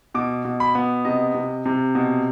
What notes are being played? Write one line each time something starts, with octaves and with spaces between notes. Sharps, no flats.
B2 D6
B2
B5
B3
C3 D#5
C3
C3
B2